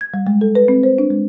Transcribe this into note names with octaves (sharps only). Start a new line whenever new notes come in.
G#6
G3
G#3
A4
B4
C4
C5
D4
G#3